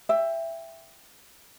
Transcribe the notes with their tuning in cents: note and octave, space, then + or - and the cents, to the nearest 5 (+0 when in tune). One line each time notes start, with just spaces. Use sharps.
E5 +10 G5 +20